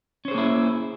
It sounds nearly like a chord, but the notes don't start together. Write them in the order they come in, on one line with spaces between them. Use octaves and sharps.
C#4 C5 G#4 A#3 E4